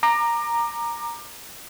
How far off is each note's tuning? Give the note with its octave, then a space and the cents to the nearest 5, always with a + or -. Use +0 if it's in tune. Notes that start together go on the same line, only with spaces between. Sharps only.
A#5 +0 D6 +30